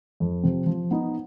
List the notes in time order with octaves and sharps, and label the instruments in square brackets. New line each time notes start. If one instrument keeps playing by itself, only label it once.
[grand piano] F2
C3 F3 C4
F3
B3 D#4